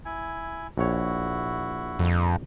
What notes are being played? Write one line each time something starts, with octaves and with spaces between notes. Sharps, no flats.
E4 G#5
A#1 E4 F#4 C#5
F2